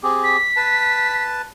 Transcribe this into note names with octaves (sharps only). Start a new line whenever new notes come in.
C4 G4 G#4
B6
B4 A5